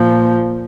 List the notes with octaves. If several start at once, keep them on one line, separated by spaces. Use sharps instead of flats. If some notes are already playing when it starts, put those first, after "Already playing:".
Already playing: A#2 F3